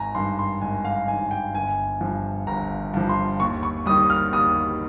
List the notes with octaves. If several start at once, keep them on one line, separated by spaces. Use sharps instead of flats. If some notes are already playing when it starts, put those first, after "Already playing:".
Already playing: G#1 G#5 A#5
G2 D#3 C6
C6
G#1 G#5
F5
G2 D#3 G#5
G5
G1 G#5
G2 F3
G1 A#5
G2 F3
C6
D#2 C#6
C#6
D#3 G3 D#6
F6
D#2 D#6